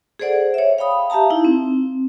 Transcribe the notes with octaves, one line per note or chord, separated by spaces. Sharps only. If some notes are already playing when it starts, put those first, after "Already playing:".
G#4 A4 C5 D5 F#5
C#5 E5
F5 G5 B5 D#6
G4 E5 F5 A5 A#5
D#4 E4
C4